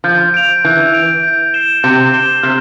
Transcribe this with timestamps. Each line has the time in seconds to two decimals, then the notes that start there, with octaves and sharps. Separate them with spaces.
0.04 F3 G6
0.34 D7 F7
0.64 E3 G6
0.94 D7 F7
1.23 G6
1.54 C7 E7 G7
1.83 C3 G6
2.13 C7 E7 G7
2.43 C3 F6